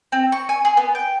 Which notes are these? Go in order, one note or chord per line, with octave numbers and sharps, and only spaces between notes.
C4
C#6
G#5
G#4
B3
G5